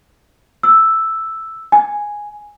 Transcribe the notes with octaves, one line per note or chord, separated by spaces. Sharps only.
E6
G#5